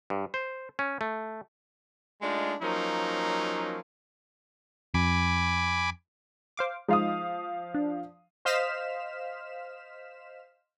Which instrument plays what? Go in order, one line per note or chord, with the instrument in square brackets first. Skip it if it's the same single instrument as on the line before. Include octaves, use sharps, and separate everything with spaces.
[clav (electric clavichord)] G2
C5
C#4
A3
[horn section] G#3 A3 D4 D#4 F4
F3 F#3 A#3 C#4 D#4
[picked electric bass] F2 [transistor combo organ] G#5 B5 D6
[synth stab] C5 F5 D6
[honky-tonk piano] F3 F5 D#6 [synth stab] G#3 D#4 F4
[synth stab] D4
C5 D#5 F5 F6 B6 E7